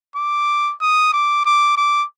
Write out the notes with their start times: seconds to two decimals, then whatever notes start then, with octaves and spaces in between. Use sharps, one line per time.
0.15 D6
0.81 D#6
1.13 D6
1.45 D6
1.77 D6